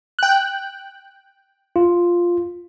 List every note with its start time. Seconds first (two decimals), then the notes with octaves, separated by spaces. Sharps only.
0.19 G5 F#6
1.76 F4